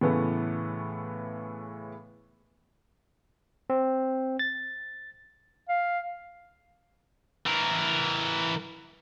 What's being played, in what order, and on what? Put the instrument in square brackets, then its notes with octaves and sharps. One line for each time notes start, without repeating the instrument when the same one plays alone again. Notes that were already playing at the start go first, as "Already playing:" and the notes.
[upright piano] A2 C#3 E3 A3 B3
[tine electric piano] C4
A6
[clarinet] F5
[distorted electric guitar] E3 A#4